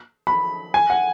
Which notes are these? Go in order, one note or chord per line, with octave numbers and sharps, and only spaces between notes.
B5
G#5
F#5